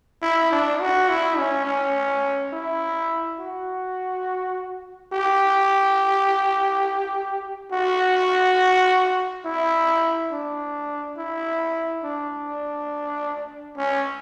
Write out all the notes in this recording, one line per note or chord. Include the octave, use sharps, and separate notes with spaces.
E4
D4
F#4
E4
C#4
C#4
E4
F#4
G4
F#4
E4
D4
E4
D4
C#4